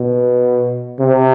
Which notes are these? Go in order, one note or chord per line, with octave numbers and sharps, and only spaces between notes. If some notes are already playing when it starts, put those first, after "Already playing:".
Already playing: B2
C3